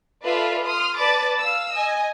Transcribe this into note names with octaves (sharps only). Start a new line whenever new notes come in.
F4 A4 B4 D5 E5 F5
C6 D#6 F6
B4 D5 A5 B5 D6 A6
F5 E6
D#5 G#5